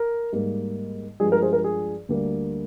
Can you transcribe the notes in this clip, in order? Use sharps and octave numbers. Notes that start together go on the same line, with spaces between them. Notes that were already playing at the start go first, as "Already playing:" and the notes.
Already playing: A#4
G#2 G3 A#3
G2 F3 G#3 G#4
A#4
G#4 C5
A#4
G#4
D2 D3 G3 A#3